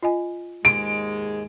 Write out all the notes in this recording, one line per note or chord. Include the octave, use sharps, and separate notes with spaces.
F4 D#5 G#5
D#2 G#2 G#3 D7